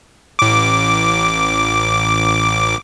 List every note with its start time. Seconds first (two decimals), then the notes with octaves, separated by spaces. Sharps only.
0.39 A1 D6